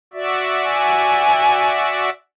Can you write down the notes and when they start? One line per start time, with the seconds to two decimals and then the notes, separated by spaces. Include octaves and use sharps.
0.14 F#4 D5 E5
0.71 G#5